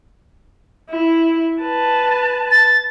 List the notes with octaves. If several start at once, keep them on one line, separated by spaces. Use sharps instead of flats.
E4
B4 A5
A6